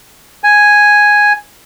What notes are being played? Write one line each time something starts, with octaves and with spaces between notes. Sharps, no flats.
G#5